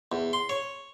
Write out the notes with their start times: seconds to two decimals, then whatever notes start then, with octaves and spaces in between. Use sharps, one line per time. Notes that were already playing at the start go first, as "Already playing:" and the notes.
0.12 E2
0.33 C6
0.49 C#5